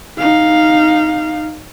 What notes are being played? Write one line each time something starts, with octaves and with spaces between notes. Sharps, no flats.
D#4 F5